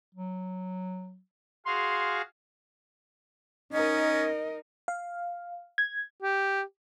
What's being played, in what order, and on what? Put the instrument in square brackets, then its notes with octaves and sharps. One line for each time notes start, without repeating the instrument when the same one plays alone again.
[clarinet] F#3
[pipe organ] F#4 G#4 F5 [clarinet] C6
[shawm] C#4 [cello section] D#4 A#4 [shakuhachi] D#5
[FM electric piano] F5
G#6
[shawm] G4